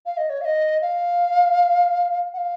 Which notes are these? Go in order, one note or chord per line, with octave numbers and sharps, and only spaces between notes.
F5
D#5
C#5
F5
D#5
F5
F#5
F5